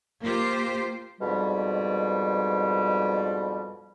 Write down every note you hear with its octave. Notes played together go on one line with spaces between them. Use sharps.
A#3 F4 G4 C5
F2 G#2 B2 G3